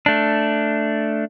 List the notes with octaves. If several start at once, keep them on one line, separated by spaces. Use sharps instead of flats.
A3 D4